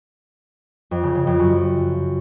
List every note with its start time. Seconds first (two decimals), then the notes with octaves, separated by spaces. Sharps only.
0.91 F2
1.03 C#3
1.15 C#3
1.27 F2
1.39 F#2